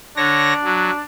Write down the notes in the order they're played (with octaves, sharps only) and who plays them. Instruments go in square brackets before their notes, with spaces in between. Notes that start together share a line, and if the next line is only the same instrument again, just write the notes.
[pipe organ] D3 C#5 A#6 [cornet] D4
[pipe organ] F#3